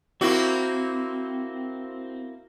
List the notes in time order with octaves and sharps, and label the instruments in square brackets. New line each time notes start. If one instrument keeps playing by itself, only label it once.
[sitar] A#3 E4 F#4 [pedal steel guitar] C4